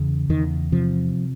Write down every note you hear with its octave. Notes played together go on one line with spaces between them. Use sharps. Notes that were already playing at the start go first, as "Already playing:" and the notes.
Already playing: E2 C#3
E2 D#3
C3 F3